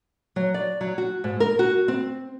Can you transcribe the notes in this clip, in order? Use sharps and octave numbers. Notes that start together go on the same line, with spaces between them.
F#3
D5
F#3
F#4
G#2
A#4
F#4
C4